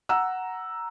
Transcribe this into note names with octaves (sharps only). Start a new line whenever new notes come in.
F#5 A#5 E6